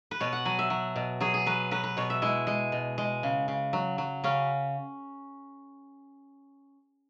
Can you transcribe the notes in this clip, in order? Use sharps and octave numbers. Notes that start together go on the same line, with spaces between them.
B4
B2 C#5
F#5
F#3 G#5
E5
F#3
B2
F#3 G#4
G#4
F#3 B4
F#3 B4
B4
B2 C#5
E5
G#3 E4
G#3
B2
G#3
C#3
C#3
F#3
F#3
C#3 C#4